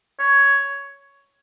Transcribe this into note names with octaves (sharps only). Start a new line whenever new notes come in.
C#5